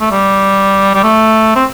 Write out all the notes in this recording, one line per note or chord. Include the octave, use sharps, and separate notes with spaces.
A3
G3
G3
A3
C4